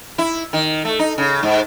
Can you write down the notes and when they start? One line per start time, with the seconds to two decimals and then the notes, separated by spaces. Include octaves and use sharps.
0.18 E4
0.53 D#3
0.85 A3
0.99 D#4
1.18 C#3
1.43 G#2